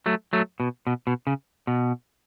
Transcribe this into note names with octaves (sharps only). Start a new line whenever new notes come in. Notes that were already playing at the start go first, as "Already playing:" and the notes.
F#3 A3
F#3 A3
B2
B2
B2
C#3
B2